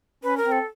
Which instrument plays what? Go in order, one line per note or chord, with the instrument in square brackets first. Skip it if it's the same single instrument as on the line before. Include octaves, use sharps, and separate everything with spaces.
[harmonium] C#4 [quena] B4
[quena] A#4
[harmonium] C4
[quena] A4